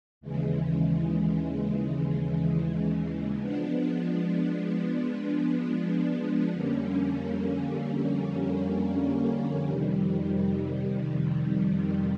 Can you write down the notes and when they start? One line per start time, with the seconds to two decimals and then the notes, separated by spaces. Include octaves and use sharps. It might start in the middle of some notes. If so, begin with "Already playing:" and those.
0.21 D#2 C#3 E3 G#3
3.37 F3 G#3 B3 D4
6.52 F2 D3 G3 A#3 C#4
9.67 F2 C3 D#3 G3